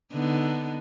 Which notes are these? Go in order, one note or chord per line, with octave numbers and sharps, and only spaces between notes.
D3 B3 D#4